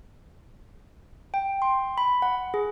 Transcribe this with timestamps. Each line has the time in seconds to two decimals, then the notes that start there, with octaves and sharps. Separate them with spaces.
1.34 G5
1.62 C6
1.98 B5
2.22 F#5
2.54 G#4